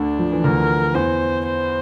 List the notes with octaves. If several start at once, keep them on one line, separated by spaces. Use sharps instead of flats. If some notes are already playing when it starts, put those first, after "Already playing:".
Already playing: D2 D3 D4
F3
E3
D2 D3 A#4
E2 E3 C5
C5